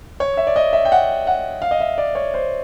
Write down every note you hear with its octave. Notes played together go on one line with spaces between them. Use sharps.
C#5
E5
D5
D#5
E5
G5
F#5
F#5
F5
D#5
E5
D5
C#5
C5